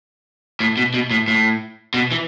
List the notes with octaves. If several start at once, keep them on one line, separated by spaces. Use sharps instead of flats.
A2
B2
B2
A2
A2
B2
E3